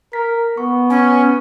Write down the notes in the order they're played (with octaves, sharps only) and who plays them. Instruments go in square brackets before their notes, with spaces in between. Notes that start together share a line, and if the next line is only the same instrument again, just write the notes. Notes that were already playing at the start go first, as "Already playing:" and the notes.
[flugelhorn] A#4 [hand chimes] B6
[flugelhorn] B3 [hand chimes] C#6
[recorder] C#4 [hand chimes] G#5 C#6